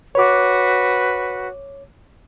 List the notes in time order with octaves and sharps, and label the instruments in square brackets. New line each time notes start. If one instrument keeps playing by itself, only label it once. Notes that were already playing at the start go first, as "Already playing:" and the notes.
[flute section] F#4 B4 [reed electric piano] C#5 D6